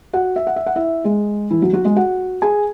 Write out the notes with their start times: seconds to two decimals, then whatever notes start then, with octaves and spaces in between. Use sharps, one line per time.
0.13 F#4 F#5
0.36 E5
0.47 F#5
0.56 E5
0.66 F#5
0.76 E4 E5
1.04 G#3 G#4
1.51 E3 E4
1.62 F#3 F#4
1.73 F#3 F#4
1.85 G#3 G#4
1.96 F#4 F#5
2.42 G#4 G#5